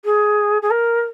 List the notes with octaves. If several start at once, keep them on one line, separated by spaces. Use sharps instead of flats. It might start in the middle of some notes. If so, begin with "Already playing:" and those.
G#4
G#4
A#4